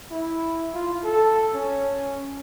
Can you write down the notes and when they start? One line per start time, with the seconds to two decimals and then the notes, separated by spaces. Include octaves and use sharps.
0.11 E4
0.74 F4
1.04 A4
1.54 C#4